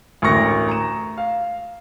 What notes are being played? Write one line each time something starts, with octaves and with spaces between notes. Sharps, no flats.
A1 D2 A#4 C#6 A#6
A#5 E7
F5